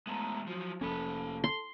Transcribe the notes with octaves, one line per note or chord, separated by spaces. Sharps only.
G#3 A3 B3 A5 A#5
F3 F#3 F#4
F1 F3 A#3 C#4 A4 A5 B5
C6